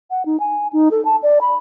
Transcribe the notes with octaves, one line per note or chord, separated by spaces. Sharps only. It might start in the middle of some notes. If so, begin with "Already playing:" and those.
F#5
D#4
G#5
D#4
A4
A5
D5
B5